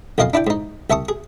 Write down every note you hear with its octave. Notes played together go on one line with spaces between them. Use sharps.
B1 F2 F4 D#5 F5 G#5
D4 E4 D5 G5
G#2 D#4
C2 E5 A5 C#6 D#6
G#4